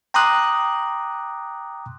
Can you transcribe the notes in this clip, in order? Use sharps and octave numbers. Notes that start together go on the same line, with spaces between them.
G5 A#5 C6 D6 D#6 F#6